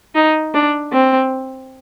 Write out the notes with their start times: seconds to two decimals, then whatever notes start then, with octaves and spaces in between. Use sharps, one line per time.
0.15 D#4
0.54 D4
0.93 C4